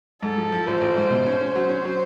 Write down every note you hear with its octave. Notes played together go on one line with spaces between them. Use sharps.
G#2 A4
F3
F3
A1 C5
A1
G#2
B2
C#4
C#4
F#3 C5
C#4
F#3